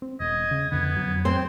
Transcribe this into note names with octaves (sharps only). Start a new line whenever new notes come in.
C4
E1 D#5 G#6
C#3
F2 D3 B3
F2 F#3
C4 G5 C6